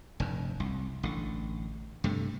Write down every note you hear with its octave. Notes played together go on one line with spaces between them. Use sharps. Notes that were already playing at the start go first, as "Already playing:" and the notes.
F1 G2
C2
A1 D3
G2 C3 A3